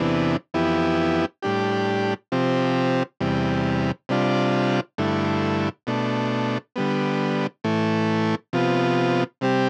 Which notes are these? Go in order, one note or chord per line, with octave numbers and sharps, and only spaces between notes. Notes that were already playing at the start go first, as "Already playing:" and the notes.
Already playing: E2 C3 E3 B3 D4
F2 E3 B3 E4 G4
A2 G3 D4 G4
C3 F3 C4 G4
E2 C3 G3
C3 G3 D4 F4
G2 D3 A3 E4
B2 A3 D4
D3 G3 B3
A2 E3 A3
C3 F3 B3 F4
C3 G3 C4 G4